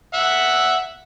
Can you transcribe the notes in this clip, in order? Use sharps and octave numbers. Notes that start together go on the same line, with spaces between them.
E5 F#5